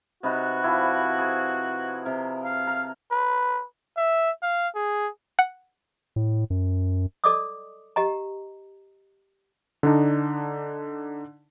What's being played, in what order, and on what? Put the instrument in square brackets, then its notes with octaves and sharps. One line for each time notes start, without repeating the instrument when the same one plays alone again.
[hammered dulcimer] C3 D#4 B4 [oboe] F#4
[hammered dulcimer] F3 E4 G4
G#4 C5
C3 A#4
[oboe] F5
[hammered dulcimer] A#4
[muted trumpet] B4
[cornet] E5
F5
G#4
[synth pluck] F#5
[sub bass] A2
F#2
[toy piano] A4 D5 D#5 D6 D#6
G4 D#5 A#5
[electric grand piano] D3 D4 D#4